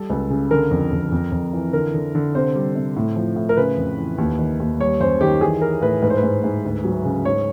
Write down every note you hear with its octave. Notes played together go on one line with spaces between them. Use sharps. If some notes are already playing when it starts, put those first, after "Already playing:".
Already playing: G3 A4
C#2
C#3
D3 A#4
F2
F2
F2
F2
E3
D3 A#4
D3
D3
C3 C5
G3
C3
A2
F3
A2
A#4
C#3 B4
F2
E3
D#2
D#3
D#2
G3 C#5
F#2 C5
D#3 G4
E3 G#4
E3 A#4
A2 B4
G#2 B4
C5
B4
G#2
G#2
D2
F#3
C#3
G#2 C#5